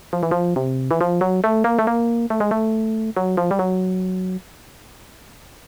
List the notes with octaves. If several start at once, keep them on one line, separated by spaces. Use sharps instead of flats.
F3
E3
F3
C3
E3
F3
F#3
A3
A#3
A3
A#3
A3
G#3
A3
F#3
F3
G3
F#3